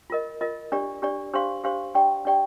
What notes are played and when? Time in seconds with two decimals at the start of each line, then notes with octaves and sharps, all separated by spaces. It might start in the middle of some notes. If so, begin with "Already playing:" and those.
0.10 F4 A#4 D#5
0.41 F4 A#4 D#5
0.72 D4 G4 D5
1.02 D4 G4 D5
1.33 D4 G4 C5 F5 C6
1.64 D4 G4 C5 F5 C6
1.95 D4 G4 D5 G5
2.25 D4 G4 D5 G5